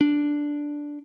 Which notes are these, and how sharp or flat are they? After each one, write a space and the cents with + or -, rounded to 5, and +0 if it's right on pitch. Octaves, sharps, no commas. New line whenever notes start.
D4 -5